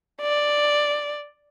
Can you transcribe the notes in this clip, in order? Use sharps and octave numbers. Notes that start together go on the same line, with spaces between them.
D5